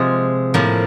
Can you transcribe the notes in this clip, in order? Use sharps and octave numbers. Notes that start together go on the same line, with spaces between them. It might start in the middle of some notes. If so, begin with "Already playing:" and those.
Already playing: C3 F3 G#3 G#4
A2 F3 A#3